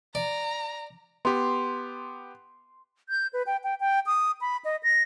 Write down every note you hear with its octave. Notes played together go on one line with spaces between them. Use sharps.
D5 A#5
B3 G4 C6
G6
B4
G5
G5
G5
D#6
B5
D#5
A#6